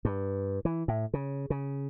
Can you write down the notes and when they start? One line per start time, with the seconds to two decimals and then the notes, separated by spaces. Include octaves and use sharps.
0.05 G2
0.65 E3
0.88 A2
1.14 C#3
1.50 C#3